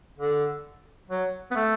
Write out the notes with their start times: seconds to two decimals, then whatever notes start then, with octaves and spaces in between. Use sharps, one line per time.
0.19 D3
1.10 F#3
1.51 B3
1.56 A3